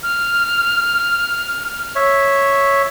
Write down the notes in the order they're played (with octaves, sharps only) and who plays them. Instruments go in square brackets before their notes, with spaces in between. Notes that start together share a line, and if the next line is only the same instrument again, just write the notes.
[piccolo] F6
[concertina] C#5 E5